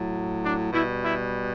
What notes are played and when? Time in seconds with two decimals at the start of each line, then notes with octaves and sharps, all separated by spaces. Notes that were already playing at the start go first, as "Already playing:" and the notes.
Already playing: A2 F#3
0.43 D4
0.72 B2 G3 E4
1.03 E4